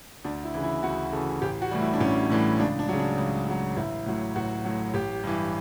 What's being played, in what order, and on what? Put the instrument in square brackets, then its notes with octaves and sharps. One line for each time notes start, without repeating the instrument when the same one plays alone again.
[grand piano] D2 D4
E4
C#3 E3
E4
D2 F#4
C#3 A4
E3
A1 G4
F#4
A2 E3 G3
E4
D4
A1 C#4
A2 E3 G3
C#2 D4
D4
C#3 F#3
D4
C#2
C#3 F#3
A1 E4
A2 F#3
A1 F#4
A2 F#3
A1 G4
G2 E3